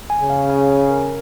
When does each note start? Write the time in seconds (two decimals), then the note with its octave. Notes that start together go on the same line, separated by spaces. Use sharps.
0.10 G#5
0.20 C#3
0.30 F5
0.50 G#5
0.70 G#5
0.90 A#4